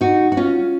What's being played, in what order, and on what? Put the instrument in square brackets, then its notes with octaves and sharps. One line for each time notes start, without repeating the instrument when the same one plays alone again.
[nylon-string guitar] D#4 F#4
F#4
C#4 F4